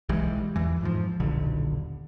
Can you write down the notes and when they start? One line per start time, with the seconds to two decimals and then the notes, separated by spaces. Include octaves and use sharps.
0.09 B1 E3 G3 G#3
0.56 E2 E3
0.81 F2 G#2 F3
1.20 D#1 B1 D3